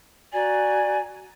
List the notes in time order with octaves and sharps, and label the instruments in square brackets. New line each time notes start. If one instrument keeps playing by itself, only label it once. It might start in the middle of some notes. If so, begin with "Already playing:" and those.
[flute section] F#4 G#5 A#5 [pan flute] D5